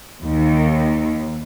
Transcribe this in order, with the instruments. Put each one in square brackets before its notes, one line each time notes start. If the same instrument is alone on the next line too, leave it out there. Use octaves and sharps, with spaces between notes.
[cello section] D#2